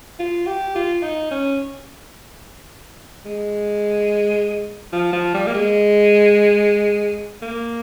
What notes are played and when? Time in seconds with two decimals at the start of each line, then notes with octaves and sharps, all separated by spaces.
0.20 F4
0.47 G4
0.76 F4
1.03 D#4
1.31 C#4
3.25 G#3
4.93 F3
5.13 F3
5.34 G3
5.47 A#3
5.54 G#3
7.43 A#3